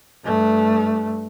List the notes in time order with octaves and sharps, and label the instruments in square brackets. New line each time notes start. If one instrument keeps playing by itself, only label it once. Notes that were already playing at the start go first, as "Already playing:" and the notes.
[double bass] G2 A3